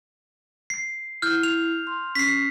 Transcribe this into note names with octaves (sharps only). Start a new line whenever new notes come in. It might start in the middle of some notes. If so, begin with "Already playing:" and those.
C7
E4 F6 G6
F7
C6
C#4 B6 C7